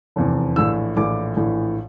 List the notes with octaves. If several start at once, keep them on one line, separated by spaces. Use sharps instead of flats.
F1 E2 C3
A#1 A2 E3 E6
A#1 A2 E3 D6
A#1 A2 E3